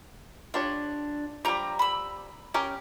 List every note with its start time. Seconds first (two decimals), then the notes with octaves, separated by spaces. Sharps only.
0.54 D4 F4 G4 C#5
1.45 F3 G3 G4 A#5
1.79 B5 E6
2.54 C#4 G4 A#4 G#5